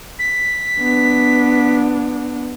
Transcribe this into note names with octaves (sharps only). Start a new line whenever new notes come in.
B6
B3 D4